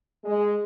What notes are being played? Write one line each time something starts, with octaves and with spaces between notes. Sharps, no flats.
G#3